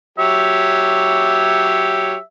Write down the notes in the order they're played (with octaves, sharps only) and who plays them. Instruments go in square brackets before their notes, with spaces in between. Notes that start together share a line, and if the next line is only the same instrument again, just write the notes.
[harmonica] F#3 G4 C#5 [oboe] E5